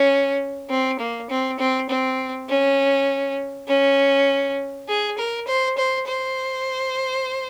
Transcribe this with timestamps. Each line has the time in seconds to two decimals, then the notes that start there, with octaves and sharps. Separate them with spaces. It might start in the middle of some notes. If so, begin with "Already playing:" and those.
Already playing: C#4
0.70 C4
0.99 A#3
1.30 C4
1.59 C4
1.89 C4
2.49 C#4
3.68 C#4
4.88 G#4
5.18 A#4
5.47 C5
5.77 C5
6.07 C5